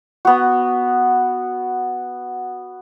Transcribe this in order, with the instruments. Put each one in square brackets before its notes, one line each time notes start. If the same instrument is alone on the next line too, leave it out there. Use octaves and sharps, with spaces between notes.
[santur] B3 F#4